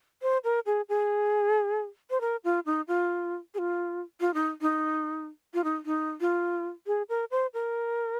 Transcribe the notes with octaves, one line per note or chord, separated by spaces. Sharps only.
C5
A#4
G#4
G#4
C5
A#4
F4
D#4
F4
G#4
F4
F4
D#4
D#4
F4
D#4
D#4
F4
G#4
A#4
C5
A#4